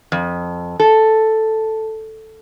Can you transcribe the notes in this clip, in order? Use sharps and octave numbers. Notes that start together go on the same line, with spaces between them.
F2
A4